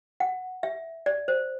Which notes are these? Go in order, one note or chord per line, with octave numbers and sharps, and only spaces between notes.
F#5
E5
D5
C5